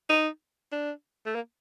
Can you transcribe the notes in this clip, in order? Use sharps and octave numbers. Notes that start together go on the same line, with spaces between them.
D#4
D4
A3
A#3